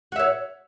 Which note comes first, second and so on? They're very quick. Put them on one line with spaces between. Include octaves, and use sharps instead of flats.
F#4 E5 C#5